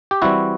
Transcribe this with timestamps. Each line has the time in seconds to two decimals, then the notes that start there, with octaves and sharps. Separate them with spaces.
0.11 G4
0.22 E3 G3 C4 E4 F#4